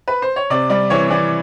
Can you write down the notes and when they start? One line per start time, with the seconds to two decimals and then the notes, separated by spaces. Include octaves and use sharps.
0.08 B4
0.22 C5
0.36 C#5
0.50 C3 D5
0.70 G3 D5
0.90 E3 C#5
1.10 E3 D5